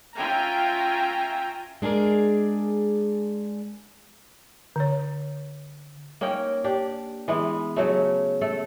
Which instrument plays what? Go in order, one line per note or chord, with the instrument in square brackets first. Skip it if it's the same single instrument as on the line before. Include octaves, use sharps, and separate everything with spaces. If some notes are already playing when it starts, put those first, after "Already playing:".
[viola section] C#4 F4 E5 G5 G#5 A#5
[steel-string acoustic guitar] G#3 D4 G#4 A#4 D5
[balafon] D3 C#5
[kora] A#3 C#4 D#4 G5
D4 G4
E3 G#3 B3
C#3 F#3 A3
A3 A4